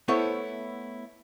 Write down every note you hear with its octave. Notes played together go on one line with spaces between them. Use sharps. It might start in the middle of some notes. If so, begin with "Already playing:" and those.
A3 B3 E4 A4 C5 C#5